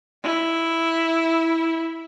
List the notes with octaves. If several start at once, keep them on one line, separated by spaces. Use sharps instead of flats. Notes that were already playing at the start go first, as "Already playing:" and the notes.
E4